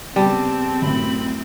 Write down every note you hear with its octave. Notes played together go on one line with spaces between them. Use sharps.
C#3 G3 B3 C4 A5
F#2 A2 B5